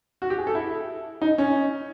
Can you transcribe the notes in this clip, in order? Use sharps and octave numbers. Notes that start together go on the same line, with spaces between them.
F#4
G4
G#4
A4
E4
D#4
C#4